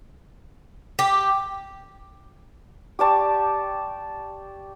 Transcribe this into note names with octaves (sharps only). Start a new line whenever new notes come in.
G4
G4 D5 A5 C#6